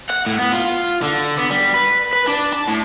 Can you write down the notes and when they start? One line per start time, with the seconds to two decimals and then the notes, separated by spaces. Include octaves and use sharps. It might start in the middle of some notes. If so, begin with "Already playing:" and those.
0.09 F#5
0.26 A2
0.39 B3
0.53 F4
1.02 D3
1.38 B3
1.51 G3
1.74 B4
2.13 B4
2.28 D4
2.53 A5
2.68 A2